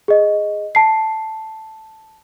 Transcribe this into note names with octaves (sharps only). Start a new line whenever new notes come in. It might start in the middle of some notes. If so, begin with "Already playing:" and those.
G#4 D#5
A5 C7